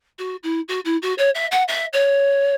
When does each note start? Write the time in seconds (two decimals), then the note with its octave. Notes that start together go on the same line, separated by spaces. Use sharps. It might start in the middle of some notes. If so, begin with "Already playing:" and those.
0.19 F#4
0.43 E4
0.68 F#4
0.85 E4
1.02 F#4
1.18 C#5
1.35 E5
1.51 F#5
1.68 E5
1.93 C#5